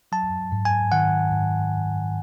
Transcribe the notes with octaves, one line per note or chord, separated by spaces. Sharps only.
F#3 A5
G#2
G#5
D#3 F#5
G#2